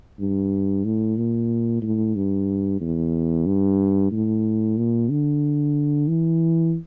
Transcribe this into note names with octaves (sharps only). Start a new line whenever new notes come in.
G2
A2
A#2
A2
G2
E2
G2
A2
A#2
D3
E3